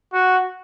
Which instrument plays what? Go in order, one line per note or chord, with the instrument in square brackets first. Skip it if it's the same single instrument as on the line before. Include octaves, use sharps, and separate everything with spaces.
[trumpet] F#4